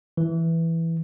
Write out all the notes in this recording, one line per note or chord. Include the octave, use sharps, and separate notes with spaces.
E3